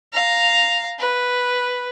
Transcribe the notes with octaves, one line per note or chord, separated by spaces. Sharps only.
F5 A#5
B4